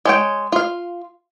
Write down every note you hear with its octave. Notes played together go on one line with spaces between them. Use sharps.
G#3 C#5 G5
F4 F5